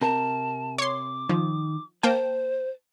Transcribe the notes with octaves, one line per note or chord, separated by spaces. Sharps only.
C3 A#4 A5
C#5 C6 D6
D#3 F3
A#3 C5 G5 A5